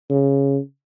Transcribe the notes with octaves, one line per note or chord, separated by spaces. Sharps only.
C#3